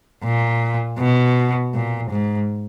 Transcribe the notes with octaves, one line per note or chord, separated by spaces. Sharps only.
A#2
B2
A#2
G#2